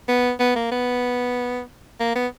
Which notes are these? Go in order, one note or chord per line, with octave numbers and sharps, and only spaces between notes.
B3
B3
A#3
B3
A#3
B3